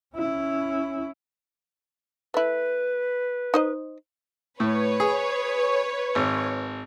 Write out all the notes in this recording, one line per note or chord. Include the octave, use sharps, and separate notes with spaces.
C#4 E4
A3 E4 B4
D#4 C5 D#5
A2 B4 C#5
G#4
G#1